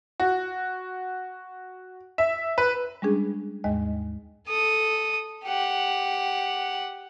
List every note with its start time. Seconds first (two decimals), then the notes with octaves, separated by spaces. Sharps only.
0.20 F#4
2.18 E5
2.58 B4
3.02 G3 G#3 C#4 D4 G#4
3.64 D#2 G#2 G#3 D#5
4.48 A4 D#6
5.45 G4 F#5